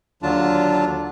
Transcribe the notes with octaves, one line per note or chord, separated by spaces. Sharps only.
D#2 D3 F#3 D4 F4 A5